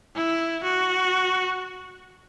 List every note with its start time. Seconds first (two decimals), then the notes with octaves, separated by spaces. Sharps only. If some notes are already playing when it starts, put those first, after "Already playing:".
0.16 E4
0.63 F#4